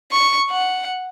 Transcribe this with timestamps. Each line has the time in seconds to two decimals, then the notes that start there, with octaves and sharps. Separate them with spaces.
0.12 C#6
0.51 F#5